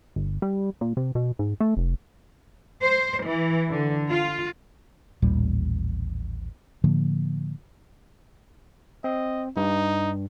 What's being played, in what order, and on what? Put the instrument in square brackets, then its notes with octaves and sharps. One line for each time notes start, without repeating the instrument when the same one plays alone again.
[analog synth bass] G1
G3
A#2
C3
B2
G#2
A3
F1
[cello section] C5
E3
D3
F4
[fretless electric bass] A1 D#2 A#2 G3
A2 D3 F3 A#3
[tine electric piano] C4 [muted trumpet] D#5
[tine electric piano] G2 [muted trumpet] D#4